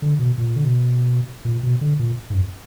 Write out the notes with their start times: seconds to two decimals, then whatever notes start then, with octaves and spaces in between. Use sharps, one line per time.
0.02 D3
0.19 B2
0.38 A#2
0.56 D3
0.64 B2
1.45 A#2
1.63 B2
1.81 D3
1.99 A#2
2.30 G#2
2.34 F#2